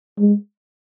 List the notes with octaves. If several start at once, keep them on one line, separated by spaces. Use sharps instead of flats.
G#3